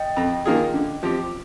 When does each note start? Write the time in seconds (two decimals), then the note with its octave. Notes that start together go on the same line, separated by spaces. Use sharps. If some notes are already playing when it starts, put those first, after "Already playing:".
Already playing: D#5 G5
0.17 F2
0.45 D#3 A#3 F4 G#4
0.74 D3
1.03 F3 C4 G4